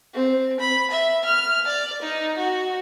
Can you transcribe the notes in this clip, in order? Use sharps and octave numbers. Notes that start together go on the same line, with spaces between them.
C4
B5
E5
F6
D5
D#4
F#4